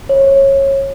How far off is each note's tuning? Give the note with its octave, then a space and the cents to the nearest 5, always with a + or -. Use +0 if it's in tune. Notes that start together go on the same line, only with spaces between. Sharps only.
C#5 -20